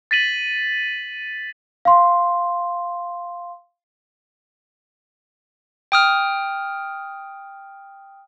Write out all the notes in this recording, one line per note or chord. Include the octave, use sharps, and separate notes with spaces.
A6 B6 D#7 F#7
F5 C6
G5 D#6 F6